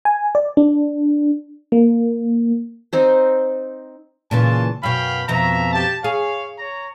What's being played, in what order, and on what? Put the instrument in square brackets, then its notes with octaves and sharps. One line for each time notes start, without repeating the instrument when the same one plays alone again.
[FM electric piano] G#5
D5
D4
A#3
[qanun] C4 D#4 C5
[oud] A#2 C#3 E3 [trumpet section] F4 A5
[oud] F#2 B2 [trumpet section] F5 G5 B5
[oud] F2 B2 F3 [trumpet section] E5 A#5
[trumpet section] G4 A5
[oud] G#4 [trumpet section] C#5 F5
[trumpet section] C#5 A#5